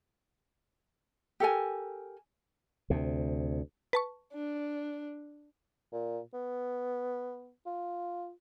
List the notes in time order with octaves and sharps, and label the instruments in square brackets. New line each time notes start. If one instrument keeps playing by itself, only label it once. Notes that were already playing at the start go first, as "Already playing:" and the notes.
[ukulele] G4 A4 A#4 G#5
[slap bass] D2 C3
[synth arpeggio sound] B4 A5 C#6
[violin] D4
[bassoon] A#2
B3
F4